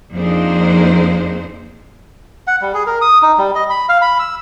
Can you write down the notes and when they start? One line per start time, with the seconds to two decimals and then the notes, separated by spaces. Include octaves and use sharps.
0.13 F2 A#3 D4 D#4 G#4 C5
2.47 F#5
2.61 G3
2.74 G#4
2.86 A#4
3.01 D#6
3.22 D#4
3.38 G3
3.55 D#5
3.70 B5
3.89 F5
4.02 B5
4.20 E6